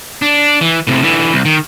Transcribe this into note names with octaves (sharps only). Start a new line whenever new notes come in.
D4
E3
A2 C3
D3 E3
C2
D#3